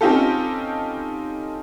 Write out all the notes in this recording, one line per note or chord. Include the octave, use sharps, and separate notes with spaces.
C4 C#4 D#4 F4 G4 A4